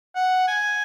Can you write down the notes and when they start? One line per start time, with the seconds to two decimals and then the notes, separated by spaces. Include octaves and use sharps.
0.15 F#5
0.48 G#5